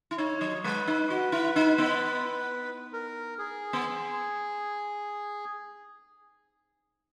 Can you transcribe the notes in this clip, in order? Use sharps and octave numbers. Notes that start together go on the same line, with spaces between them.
E4
D#4 C#5
F#3
G#3 B4
D#4
F#4
E4
D#4
B3
A#4
G#4
B3